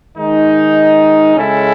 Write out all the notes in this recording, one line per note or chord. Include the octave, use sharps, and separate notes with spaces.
D#3 G#3 D#4
C#3 G#3 C#4 E4 A4